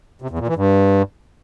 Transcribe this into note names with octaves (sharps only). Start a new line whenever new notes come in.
C3
E2
A#2
E3
G2